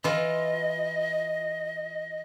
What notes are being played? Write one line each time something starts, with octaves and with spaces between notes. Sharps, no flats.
E3 F4 D#5